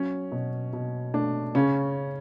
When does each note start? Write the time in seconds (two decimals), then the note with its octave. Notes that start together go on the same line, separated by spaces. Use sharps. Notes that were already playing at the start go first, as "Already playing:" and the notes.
Already playing: F#3 C#4
0.32 B2
0.73 B2
1.14 A3 D4
1.55 C#3 C#4